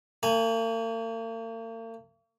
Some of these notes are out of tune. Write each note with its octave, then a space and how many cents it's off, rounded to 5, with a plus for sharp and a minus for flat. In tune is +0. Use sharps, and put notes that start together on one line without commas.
A#3 -45 G#5 +0